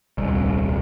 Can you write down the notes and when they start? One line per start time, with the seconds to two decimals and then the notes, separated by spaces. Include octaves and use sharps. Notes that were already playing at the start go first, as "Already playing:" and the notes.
0.18 D#1 C2